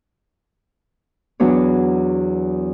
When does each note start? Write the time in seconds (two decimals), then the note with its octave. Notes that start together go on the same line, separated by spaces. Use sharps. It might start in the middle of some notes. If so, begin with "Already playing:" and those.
1.40 E2 F#3 B3 D4 C#5